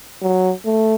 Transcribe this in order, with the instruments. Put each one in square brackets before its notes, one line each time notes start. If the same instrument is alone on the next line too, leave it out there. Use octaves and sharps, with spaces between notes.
[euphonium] F#3
A3